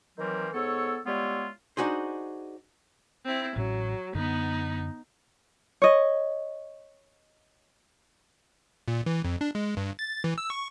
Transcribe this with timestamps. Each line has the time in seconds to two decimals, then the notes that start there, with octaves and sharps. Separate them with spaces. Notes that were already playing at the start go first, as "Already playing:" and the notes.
0.18 D#3 E3 F#3 G3 A#3 C4
0.53 G#2 B3 A4 C#5 C#6 E6
1.05 G3 G#3 B3 E4 F4 C#5
1.77 D4 D#4 F#4 G#4 C5
3.26 C4 E4
3.56 A1 A2 F#3 C#4
4.15 F#2 D3 B3 D#4
5.82 C#5 D#5
8.88 A#2
9.06 E3
9.24 F2
9.41 D4
9.55 G#3
9.77 G2
9.99 A6
10.24 E3
10.38 E6
10.50 C#6